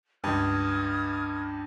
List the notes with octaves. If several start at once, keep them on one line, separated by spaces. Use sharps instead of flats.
C#2 G2 D#6 F6 G#6